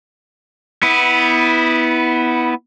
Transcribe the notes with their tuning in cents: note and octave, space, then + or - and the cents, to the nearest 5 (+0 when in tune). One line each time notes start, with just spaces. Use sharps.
B3 +0 E4 -20